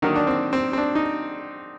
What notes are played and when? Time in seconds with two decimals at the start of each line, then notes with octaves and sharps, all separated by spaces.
0.02 D3 D#3 F#3 A#3 D#4
0.16 D4
0.27 C4
0.53 C4
0.73 C4
0.78 D4
0.95 D#4